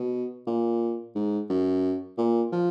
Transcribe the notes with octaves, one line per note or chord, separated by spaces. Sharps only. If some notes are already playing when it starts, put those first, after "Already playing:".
Already playing: B2
A#2
G#2
F#2
A#2
F3